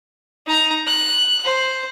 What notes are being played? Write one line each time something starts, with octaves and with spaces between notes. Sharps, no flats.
D#4 A#5
F#6
C5